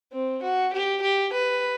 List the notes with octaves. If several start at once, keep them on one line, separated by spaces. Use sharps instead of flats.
C4
F#4
G4
G4
B4